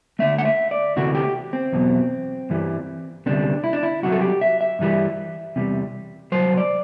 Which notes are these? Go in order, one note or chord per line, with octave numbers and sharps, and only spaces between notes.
D2 D3 A3 E5
F#5
E5
D5
D2 C3 E3 A3 F#4
G4
C4
E2 B2 F#3
G2 E3 G3
D2 C3 G3 D4
E4
D4
E4
C2 C3 F#3 F#4
A4
G4
E5
E5
G2 E3 G3
E2 C3 G3
B2 F#3 C5
C2
D5